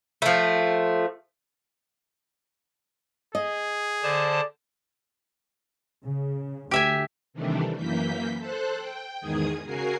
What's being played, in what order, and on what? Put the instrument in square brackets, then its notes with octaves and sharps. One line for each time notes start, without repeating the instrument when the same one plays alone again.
[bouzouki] F3 A3
[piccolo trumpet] G#4 [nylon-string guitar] D#5
[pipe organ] D3 C5 A5 [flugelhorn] D5
[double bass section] C#3
[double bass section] D2 [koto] G4 E5 G#5
[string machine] C3 D#3 E3 G3 A3 D4
F#2 E3 A#3 G6 B6
A4 C5 F#6
G5
E2 G#2 D#3 G#4 D#6 G#6
C#3 F#4 A#4 G#5 C7